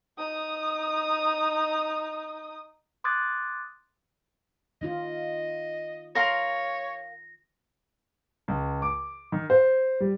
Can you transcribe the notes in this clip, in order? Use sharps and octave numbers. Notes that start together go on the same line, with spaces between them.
D#4 D#6
C6 D6 D#6 F#6 G#6 A6
D#3 D#4 F4 D#5
A#4 C#5 F5 C6 A#6
C#2
D6
D#3
C5
G3